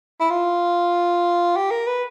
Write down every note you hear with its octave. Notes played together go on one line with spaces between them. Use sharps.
E4
F4
G4
A#4
B4